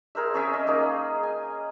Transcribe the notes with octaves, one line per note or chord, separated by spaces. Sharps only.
G#4 A#4 C5 E5
C#4 G#4 E5 G5
C#4 D#5
A#3 D#4 G#4
G#5